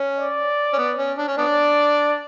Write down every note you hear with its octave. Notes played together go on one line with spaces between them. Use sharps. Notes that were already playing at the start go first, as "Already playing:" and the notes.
Already playing: C#4
D5
C#4
B3
C#4
D4
C#4
B3 D4 D5